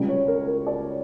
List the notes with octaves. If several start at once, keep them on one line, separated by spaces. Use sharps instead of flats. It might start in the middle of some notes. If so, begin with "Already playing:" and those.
Already playing: C#2 C#3 G3
C#5
A#4
A#4
D5